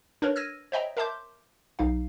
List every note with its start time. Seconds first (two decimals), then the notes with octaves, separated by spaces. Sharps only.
0.22 D4 A#4 B4 C#5
0.36 E6 F6 G#6 A#6 D#7
0.72 C5 C#5 D#5 E5 G5 A#5
0.97 A#4 E5 A5 C6 D6 G6
1.79 B1 D#4 F5